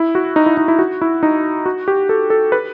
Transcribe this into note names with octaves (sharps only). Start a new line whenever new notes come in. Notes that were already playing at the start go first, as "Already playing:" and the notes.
Already playing: E4
F#4
D#4
E4
D#4
E4
F#4
E4
D#4
F#4
G4
A4
A4
B4